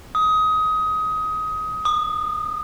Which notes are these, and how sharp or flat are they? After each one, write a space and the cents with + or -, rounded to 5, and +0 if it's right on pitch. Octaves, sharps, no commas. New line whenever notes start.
D#6 +20
D#6 -30